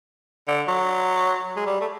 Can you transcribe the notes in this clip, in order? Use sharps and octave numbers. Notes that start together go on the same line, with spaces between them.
D3
F#3
G#3
G3
A3